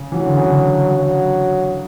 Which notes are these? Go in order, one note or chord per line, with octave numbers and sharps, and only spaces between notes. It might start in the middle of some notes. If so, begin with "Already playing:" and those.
Already playing: C#3
E3 F#3
D3
C#3
D3
F#3